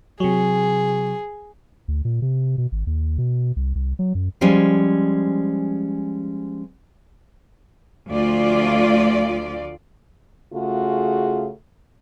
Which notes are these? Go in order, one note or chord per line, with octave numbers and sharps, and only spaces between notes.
C3 F#3 G#4
D2
A#2
C3
B2
G#1
D#2
B2
C2
C2
F#3
F#2
F3 G3 G#3 C#4
D2 F3 A3 F4 D5
C#3 A3 F4 F#4 G#4